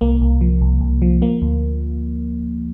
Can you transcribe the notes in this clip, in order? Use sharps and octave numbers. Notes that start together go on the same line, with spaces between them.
C2 A#3
C2
F3
C2
C2
F3
F3 A#3
D2